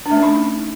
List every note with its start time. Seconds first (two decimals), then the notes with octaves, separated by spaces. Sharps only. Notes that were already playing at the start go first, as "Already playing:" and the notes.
0.06 D4
0.11 A3
0.17 C#4
0.23 D#4